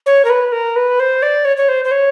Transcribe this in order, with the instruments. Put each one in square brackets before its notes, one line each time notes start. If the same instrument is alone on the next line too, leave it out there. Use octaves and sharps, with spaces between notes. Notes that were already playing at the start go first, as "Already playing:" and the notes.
[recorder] C#5
A#4
B4
A#4
B4
C5
D5
C#5
C#5
C5
C5
C#5